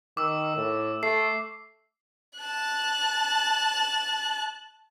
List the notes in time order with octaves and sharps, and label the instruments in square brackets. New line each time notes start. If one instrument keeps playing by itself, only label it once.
[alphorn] D#3 [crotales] D6 E6
[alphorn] A2
[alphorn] A3 [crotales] C7
[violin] A5 F#6